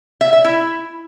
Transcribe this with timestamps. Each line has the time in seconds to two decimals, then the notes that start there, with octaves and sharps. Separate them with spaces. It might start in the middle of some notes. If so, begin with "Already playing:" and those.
0.21 E5
0.33 E5
0.44 E4